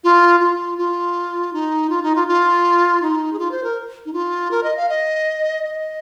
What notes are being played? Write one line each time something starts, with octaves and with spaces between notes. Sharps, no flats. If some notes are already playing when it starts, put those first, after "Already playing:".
F4
F4
F4
D#4
F4
D#4
F4
F4
D#4
G#4
F4
C5
A#4
D#4
F4
A#4
D#5
F5
D#5
D#5